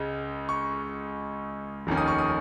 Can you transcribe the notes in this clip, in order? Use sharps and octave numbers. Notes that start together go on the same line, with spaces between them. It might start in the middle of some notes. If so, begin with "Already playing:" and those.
Already playing: C#2 C#3 G#3
C#6
F1 D#2 D#3 C#4
D#6
C#6
D#6